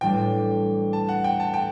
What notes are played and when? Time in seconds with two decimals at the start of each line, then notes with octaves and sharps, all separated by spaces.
0.01 A1 A2 G3 D4 G5
0.93 A5
1.09 F#5
1.24 G5
1.40 A5
1.54 G5